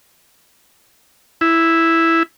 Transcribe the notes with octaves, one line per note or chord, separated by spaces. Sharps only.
E4